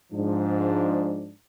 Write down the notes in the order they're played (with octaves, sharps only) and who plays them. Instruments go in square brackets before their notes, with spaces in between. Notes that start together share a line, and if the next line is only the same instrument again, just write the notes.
[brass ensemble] G#2 F3 D4